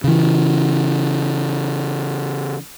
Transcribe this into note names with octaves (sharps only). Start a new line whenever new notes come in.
C#3 E3